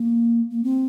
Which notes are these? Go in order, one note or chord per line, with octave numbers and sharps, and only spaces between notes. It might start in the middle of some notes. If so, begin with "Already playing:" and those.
Already playing: A#3
A#3
C4